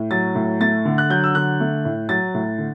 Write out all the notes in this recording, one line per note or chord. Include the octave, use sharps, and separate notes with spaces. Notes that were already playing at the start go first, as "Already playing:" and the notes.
Already playing: A2
F#3 A6
A2
A3 A6
D3
F#6
F#3 G6
E6
D3 F#6
A3
A2
F#3 A6
A2
D3